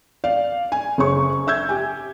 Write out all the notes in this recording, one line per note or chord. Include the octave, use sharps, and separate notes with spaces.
D5 F5
G#5
F#1 G#4 C#5 C#6
E5 E6 G6 G#6
G4 G#5